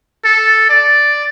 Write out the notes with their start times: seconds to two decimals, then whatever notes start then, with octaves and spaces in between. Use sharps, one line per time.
0.25 A4
0.69 D5